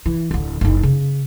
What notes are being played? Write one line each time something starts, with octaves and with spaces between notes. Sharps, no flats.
E3
D1 D3
F#1 D#4
C#3